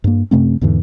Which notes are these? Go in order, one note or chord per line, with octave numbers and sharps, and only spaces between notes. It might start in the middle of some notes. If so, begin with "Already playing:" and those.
G2 A#3
F#2 C3 A3 C4
E2 G#2 D3 E3